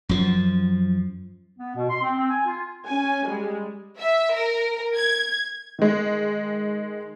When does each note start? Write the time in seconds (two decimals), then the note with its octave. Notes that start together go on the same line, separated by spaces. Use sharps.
0.09 F#2 F3
1.58 B3
1.76 B2
1.90 C6
2.02 C4
2.16 C4
2.30 G#5
2.46 F4
2.85 C#4 G#5
3.26 G3 G#3
3.98 E5
4.33 A#4
4.97 G#6
5.79 D#3 G#3